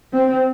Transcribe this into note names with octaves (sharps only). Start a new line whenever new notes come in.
C4